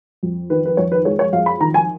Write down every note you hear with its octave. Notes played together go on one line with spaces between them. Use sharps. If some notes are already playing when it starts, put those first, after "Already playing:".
F2
D#3 B4
B4
F2 C#5
B4
G#3 C#5
C#5
F2 F5
B5
D#3 A#5
G#5